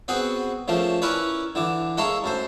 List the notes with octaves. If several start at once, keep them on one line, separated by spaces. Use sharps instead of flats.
B3 C4 F#4 G#4
C#3 F3 A3 A#3
C#4 E4 A#4 B4 C#5 D5
D3 E3 D6
G#3 A#3 E4 A4 C#5
F#2 A3 C5